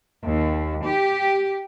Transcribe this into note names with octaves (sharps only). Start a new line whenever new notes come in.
D#2
G4